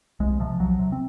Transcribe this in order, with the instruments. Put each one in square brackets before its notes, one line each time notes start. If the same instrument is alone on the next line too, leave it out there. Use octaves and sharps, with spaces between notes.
[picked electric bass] C2 G#3
C3 F3
C2 F#3
C3
C4